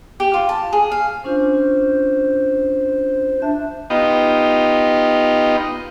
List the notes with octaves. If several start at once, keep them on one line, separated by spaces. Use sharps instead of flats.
G4
F4
A5
G#4
F5
C#4 D4 F4 C5
D4 E5
B3 D#4 F4 G4 D#5